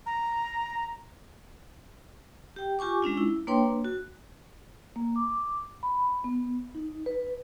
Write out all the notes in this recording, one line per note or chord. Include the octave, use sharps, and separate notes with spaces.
A#5
G4 G5
F4 G4 G#5 C#6 D6
G#3 C#4 D4 F4
E4
A#3 D4 B4 C#5 G5 C6
F#4
A#3
D6
B5
B3
D#4
B4